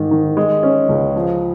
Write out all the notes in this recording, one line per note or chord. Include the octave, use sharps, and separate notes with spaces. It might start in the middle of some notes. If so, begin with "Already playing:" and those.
Already playing: G#2 D#3
D#3
G#3
C#4
C#2
F3